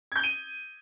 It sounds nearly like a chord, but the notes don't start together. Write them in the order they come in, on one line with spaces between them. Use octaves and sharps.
G#6 G6 G7 D#7